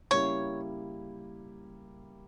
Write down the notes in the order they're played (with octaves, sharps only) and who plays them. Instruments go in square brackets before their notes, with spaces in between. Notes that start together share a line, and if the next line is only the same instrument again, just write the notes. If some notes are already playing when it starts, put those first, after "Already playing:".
[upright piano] C#3 G3 A#3 E4 [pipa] C#5